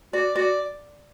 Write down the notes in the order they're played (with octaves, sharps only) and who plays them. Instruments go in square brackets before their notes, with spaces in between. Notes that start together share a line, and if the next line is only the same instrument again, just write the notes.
[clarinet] F#4 [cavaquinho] D5
[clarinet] F#4 [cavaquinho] D5